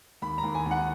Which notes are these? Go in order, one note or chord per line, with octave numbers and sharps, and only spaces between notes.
D#2 B5
A#5
D#2
G#5
D#2
F#5